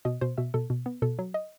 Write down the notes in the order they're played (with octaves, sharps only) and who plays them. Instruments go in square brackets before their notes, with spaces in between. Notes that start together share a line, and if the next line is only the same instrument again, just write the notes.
[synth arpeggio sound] B2 D#5
B2 C5
B2 E5
B2 A4
B2
B3
B2 A4
F#3
D#5